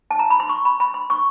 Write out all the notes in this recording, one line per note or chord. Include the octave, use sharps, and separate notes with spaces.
A5
A#5
B5
C6
C#6
B5
B5
C6
C#6